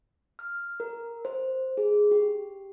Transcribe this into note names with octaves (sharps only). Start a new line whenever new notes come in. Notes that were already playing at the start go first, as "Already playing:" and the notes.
F6
A#4
C5
G#4
G4